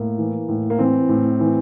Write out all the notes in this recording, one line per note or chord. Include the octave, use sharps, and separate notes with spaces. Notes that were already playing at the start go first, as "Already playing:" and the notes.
Already playing: A2 A#3
E3
A2
A#3
E3 C4
A2
E3